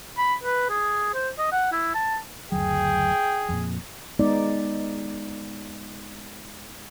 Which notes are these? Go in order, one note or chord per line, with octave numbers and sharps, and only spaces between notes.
B5
B4
G#4
C5
D#5
F#5
E4
A5
F#1 D2 F#3 G#4 G5
F2 A#2
G#3 B3 D#4 D5